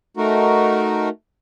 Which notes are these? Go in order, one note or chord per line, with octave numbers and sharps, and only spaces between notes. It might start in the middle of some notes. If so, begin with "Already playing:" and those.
A3 D#4 F#4 A#4